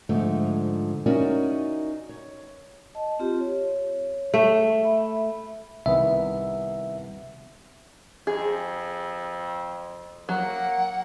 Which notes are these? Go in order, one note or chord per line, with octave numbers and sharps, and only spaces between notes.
G#2 D3 F3 A3
C#4 D#4 E4 F#4 A#4 D5
C#5
D#5 A5
C4 F4 G4
C#5
A3
E5 B5
C2 D#3 B3 E5
F2 G#4
F#3 A#3 F#5